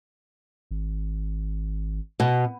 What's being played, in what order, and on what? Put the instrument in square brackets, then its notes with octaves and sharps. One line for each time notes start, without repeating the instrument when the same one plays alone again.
[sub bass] G#1
[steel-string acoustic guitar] B2